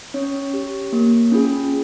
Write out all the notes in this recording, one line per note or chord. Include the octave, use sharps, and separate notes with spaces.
C#4 C#5
G4
A#3
C#4 F4 G#4